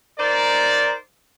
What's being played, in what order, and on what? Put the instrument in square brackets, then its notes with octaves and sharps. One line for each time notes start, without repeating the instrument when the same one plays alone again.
[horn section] D#4 A#4 C5 D5